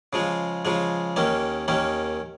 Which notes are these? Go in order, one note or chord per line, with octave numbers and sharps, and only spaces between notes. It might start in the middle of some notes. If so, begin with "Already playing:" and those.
C#3 F3 G#3
C#3 F3 G#3
D#2 D#3 A#3 C#4
D#2 D#3 A#3 C#4